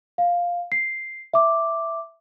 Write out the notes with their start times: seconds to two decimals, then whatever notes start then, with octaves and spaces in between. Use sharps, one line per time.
0.18 F5
0.72 C7
1.33 E5 D6